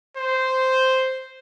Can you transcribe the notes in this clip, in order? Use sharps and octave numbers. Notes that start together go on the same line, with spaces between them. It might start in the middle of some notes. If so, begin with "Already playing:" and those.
C5